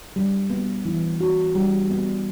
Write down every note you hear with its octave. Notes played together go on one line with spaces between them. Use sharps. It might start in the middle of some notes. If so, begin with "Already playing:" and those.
G3
B3
E3
F#4
G3
B3